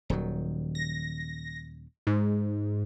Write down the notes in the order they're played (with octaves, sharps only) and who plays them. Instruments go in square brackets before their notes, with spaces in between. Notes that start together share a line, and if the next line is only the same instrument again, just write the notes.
[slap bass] D#1 D#3 F#3
[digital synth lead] A#6
G#2